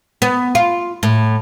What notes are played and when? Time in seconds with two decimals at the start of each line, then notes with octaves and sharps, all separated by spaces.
0.22 B3
0.55 F4
1.03 A2